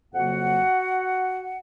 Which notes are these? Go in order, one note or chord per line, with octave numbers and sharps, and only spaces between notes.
F2 C#3 F#3 A#3 F#4 F#5